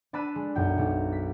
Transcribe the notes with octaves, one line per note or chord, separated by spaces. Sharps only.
D4 A5 B5 E6 F#6 D#7
G#3
B1 F#2 G5
B1
B6